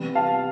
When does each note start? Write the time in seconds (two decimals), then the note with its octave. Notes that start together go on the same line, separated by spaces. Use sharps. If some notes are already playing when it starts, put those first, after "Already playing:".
Already playing: C3 E3 G3 B3
0.15 F5 A5